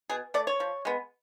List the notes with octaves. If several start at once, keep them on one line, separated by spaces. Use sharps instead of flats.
B2 G#4
A3 D5
C#5
F3
G#3 B3